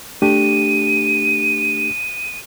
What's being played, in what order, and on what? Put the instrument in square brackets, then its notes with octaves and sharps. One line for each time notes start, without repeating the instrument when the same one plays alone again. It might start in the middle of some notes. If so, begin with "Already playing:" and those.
[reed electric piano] A3 D4 G4 [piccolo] D#7